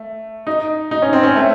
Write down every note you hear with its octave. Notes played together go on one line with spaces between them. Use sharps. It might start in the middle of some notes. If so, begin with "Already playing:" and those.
Already playing: A3
D#4
D#4
C#4
C4
C#4
A3